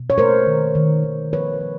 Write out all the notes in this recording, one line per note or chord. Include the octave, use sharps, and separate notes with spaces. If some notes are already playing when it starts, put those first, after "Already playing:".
Already playing: B2
C#5
A3 A#4 C5
D#3
D#3
D#3
F3 B4 C#5
F3